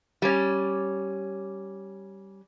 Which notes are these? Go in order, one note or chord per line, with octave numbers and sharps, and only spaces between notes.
G3 C#4